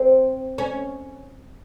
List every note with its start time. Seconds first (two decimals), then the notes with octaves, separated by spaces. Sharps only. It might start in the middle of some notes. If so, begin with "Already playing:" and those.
Already playing: C4
0.58 C#4